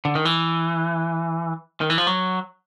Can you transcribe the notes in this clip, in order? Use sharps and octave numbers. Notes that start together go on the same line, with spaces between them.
D3
D#3
E3
D#3
E3
F3
F#3